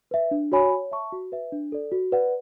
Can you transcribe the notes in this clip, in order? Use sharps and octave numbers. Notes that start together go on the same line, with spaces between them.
B4 E5
D4
F#4 C#5 G#5 B5
C#5
E5 A5 C#6
F#4
B4 E5
D4
A4 D5
F#4
B4 D5 F#5